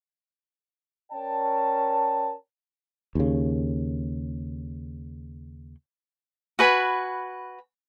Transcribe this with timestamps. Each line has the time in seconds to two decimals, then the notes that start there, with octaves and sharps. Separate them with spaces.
1.12 C#4 A#4 D5 G5 A5
3.15 D#2 C#3
6.59 F#4 B4 G#5 B5